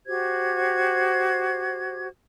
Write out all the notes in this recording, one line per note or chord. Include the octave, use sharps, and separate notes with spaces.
F#4 G4 C5 G#6